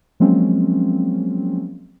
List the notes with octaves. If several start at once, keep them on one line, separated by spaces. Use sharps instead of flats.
F3 F#3 G#3 A#3 C4 C#4